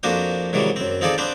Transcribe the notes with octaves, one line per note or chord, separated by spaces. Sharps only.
F2 A#3 D4 F#4 C5 D#6
G#2 C3 D#3 E3 F#3 G3
F#2 C4
C4 D#4 F4 G#4 A4 D5
B3 C4 D4 B4 C5